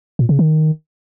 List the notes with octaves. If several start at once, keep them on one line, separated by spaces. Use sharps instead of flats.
A#2
C#3
D#3